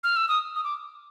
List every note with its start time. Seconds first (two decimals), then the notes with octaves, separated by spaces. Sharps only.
0.04 F6
0.16 E6
0.29 D#6
0.56 D#6
0.64 D6